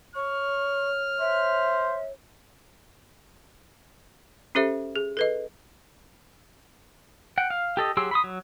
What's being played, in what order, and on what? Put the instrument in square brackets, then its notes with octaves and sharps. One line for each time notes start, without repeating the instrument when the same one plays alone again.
[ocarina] C#5 [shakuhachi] C#6 [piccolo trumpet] F6
[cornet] C5 [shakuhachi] E5
[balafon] C#4 G4 A4 C5 E5
G#4
A4 B4 D#5
[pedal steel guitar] F#5 G5
F5
G4 A4 D#5
F#3 G4 G#4 C6 E6
B5 C6 D#6
F#3